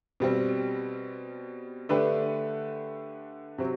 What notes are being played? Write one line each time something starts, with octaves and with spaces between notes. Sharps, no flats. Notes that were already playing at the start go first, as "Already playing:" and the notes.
B2 G3 C4
D3 A3 D4 G4 B4
C3 F#3 C4 F#4